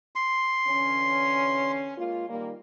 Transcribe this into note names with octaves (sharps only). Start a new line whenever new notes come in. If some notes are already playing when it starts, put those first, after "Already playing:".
C6
D3 E3 C#4
G#3 A#3 F4
D#3 G3 A#3